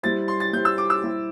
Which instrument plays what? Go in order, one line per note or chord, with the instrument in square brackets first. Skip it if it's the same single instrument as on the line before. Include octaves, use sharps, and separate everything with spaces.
[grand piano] G3 E4 C5 [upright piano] A6
[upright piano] C6
A6
[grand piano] G3 E4 C5 [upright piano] G6
[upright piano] E6
D6
E6
[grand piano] G3 E4 C5